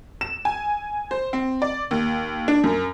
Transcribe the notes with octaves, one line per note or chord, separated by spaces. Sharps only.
E7
G#5
C5
C4
D5
D#2
D4
F#2